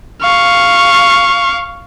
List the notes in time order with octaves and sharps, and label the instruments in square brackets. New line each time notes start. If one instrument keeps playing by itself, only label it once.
[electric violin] F5 C#6